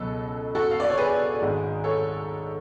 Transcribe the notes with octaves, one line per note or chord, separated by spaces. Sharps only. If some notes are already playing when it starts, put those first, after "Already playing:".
Already playing: C#2 B2 F#3 A4
F#4 A4
F5
D5
C#5
G#4 B4
G#1 G#2 G#3
A4 C#5